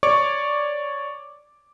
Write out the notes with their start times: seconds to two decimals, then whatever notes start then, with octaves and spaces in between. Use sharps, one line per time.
0.03 C#5 D5 C#6 D6